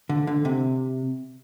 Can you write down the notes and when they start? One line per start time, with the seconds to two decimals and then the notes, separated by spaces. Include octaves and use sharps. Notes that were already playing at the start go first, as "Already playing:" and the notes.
0.09 D3
0.27 D3
0.45 C3